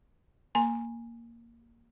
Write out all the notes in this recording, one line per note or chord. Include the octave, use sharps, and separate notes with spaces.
A#3 G#5 A#5 C6